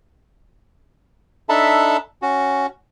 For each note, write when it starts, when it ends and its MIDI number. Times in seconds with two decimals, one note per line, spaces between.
1.49 1.97 62
1.49 1.97 63
1.49 1.97 69
1.49 1.97 76
1.49 1.97 81
1.49 1.97 83
2.22 2.66 61
2.22 2.66 66